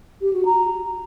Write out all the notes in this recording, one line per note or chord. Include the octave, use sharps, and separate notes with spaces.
G4
F#4
A#5